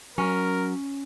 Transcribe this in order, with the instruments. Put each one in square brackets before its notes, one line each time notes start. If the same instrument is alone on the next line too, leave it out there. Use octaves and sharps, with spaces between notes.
[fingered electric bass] F#3 [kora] C#4 [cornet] A#4